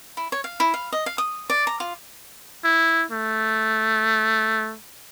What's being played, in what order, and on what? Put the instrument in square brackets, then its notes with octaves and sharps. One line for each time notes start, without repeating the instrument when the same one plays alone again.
[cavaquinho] E4
C#5
F5
E4
F5
D#5
F5
D#6
D5
A#5
F4
[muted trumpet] E4
A3